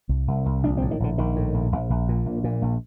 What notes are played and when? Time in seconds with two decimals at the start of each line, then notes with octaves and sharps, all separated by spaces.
0.09 C2
0.28 C2
0.46 C2
0.63 A#1 D4
0.77 C4
0.82 A2
0.91 D#3
1.00 A#1 D3
1.18 A#1 D#3
1.36 A2
1.54 A#1
1.72 A#1
1.90 A#1
2.09 A#2
2.26 A#1
2.44 A#2
2.62 A#1